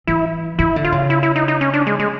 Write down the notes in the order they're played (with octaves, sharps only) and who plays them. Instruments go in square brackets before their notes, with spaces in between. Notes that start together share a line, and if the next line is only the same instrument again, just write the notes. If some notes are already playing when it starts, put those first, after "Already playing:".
[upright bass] E3 [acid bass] E4
[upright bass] D#3 [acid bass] E4
[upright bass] D3
[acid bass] F4
[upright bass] C#3
[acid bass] E4
E4
D#4
D#4
C#4
D4
G#3
G#3